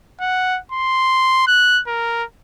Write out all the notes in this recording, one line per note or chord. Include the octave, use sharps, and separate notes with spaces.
F#5
C6
F#6
A#4